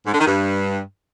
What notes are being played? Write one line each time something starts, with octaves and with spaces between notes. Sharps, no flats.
G#2
D3
D#3
G2